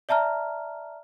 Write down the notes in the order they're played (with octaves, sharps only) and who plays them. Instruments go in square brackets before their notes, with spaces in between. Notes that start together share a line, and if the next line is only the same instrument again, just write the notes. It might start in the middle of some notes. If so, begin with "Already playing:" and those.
[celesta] D5 E5 A5 A#5 F6